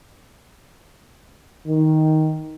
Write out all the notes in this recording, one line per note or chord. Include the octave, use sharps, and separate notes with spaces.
D#3